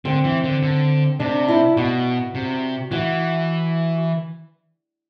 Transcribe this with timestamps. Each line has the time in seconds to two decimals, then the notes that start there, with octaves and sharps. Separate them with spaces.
0.05 D3 C4
0.24 E3
0.44 D3
0.63 D3
1.20 C3 D4
1.48 E4
1.77 B2 F#4
2.35 C3
2.91 E3 F#4